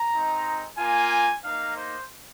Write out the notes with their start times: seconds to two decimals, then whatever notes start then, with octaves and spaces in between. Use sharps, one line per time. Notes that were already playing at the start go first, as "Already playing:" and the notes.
Already playing: A#5
0.12 G#3 C4 D#4
0.78 A#3 F4 G#5
1.44 A#3 D#4 F5
1.77 C5